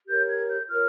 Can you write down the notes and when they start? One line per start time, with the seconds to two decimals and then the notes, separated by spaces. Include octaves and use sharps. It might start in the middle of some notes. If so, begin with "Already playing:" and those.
0.08 G4 A#4 C#5 G6
0.28 G#6
0.49 G6
0.68 F4 A#4 C#5 F6